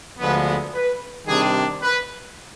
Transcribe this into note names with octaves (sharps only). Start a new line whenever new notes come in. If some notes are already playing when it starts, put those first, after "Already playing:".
D2 D3 F3 G#3 B3 B4
B4
C3 D#3 G3 D4 G#4
B4